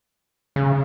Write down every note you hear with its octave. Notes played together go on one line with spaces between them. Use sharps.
C#3